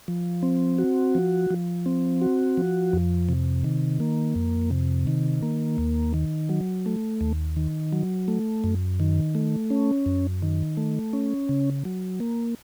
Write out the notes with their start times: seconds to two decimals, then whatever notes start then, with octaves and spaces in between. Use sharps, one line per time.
0.08 F3
0.43 C4
0.79 F#4
1.15 F3
1.51 F3
1.86 C4
2.22 F#4
2.57 F3
2.93 F2
3.29 C3
3.64 D#3
4.00 A#3
4.35 F2
4.71 C3
5.07 D#3
5.43 A#3
5.78 D#2
6.14 D#3
6.49 F#3
6.86 A3
7.21 D#2
7.56 D#3
7.92 F#3
8.28 A3
8.64 F#2
9.00 D#3
9.35 A3
9.70 C#4
10.06 F#2
10.42 D#3
10.77 A3
11.13 C#4
11.49 C#3
11.85 F#3
12.20 A#3